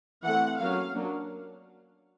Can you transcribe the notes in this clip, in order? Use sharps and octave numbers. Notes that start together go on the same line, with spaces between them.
E3 A3 C4 F#5
F#3 A#3 C#4 F5
F#3 A#3 D4